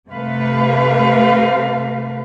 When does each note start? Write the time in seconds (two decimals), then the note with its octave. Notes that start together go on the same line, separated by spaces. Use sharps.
0.10 C3 A3 B4 F5